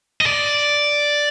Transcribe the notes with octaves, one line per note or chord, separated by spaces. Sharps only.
D#5
D5